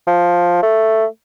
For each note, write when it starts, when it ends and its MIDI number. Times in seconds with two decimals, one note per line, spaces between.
0.07 0.58 53
0.63 1.05 57